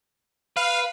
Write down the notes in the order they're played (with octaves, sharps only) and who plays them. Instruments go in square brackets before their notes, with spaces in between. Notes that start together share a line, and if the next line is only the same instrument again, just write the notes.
[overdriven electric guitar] B4 [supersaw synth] F5